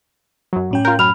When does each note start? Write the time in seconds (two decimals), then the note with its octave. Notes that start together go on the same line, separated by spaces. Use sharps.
0.53 F#2 F#3
0.71 A2 C#4 G5
0.85 F4 A#4 G6
0.99 F#2 B5 F6 F7